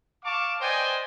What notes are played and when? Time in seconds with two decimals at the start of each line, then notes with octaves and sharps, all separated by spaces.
0.24 F5 A5 C#6 D6
0.60 B4 C5 D5 D#5 G5 G#5